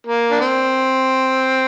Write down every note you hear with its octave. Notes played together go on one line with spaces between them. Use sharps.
A#3
D4
C4